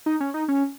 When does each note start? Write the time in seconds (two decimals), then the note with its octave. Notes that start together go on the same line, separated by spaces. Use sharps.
0.06 D#4
0.20 C#4
0.34 D#4
0.48 C#4